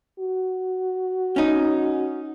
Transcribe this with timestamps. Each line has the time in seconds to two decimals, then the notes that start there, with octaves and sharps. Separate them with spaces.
0.19 F#4
1.36 C#4 D#4